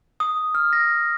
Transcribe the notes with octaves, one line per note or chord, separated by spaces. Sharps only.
D#6
F6
A#6